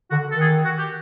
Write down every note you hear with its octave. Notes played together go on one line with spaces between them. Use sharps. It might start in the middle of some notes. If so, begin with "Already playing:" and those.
D3 F#4
D#3 A4
G#4
F#4
G4